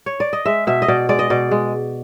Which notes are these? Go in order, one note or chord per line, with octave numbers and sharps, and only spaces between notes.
C#5
D5
D#5
G#3 E5
B2 E5
D#5
B2 D5
G#3 D5
D#5
B2 D5
G#3